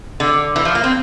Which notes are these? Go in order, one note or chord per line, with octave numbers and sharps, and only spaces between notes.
D3
E3
F3
A#3
C4